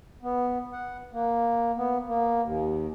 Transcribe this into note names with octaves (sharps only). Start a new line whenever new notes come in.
B3
F#5
A#3
B3
A#3
D#2